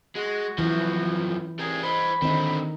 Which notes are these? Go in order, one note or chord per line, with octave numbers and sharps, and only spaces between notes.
G#3 F#4
F#2 E3 F3
G3 G#4 A#4
C5 D#5 B5
D3 D#3 C4 D#4